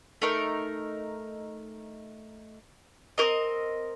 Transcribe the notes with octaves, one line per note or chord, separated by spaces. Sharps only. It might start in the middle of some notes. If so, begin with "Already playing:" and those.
A3 D#4 A#4
C4 G4 A#4 D#5